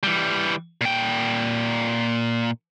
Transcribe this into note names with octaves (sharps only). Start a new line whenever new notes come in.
E3 G3
A#2 G5